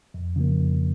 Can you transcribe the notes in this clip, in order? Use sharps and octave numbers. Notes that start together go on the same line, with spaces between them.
F2
C#3 F3 A#3
F2